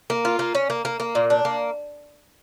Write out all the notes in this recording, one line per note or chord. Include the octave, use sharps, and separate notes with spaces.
A#3
F4
A#3
C#4
A#3
A#3
A#3
A#2
D4
A#3